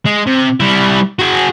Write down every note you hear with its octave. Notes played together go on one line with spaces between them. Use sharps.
G#3
C3
G3 E4
F#4 G#4